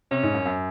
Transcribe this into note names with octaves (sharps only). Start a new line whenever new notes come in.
C3 C#4
G#2
F#2
F#2